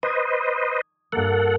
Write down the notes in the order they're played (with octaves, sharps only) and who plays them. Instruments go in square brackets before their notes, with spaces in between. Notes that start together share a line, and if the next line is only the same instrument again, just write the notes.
[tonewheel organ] B4 C5 D#5 [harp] D#6 G#6
[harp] G2 A#3 [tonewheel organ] A4 F#5